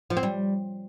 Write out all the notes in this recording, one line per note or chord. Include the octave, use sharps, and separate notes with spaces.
F3
C4
G3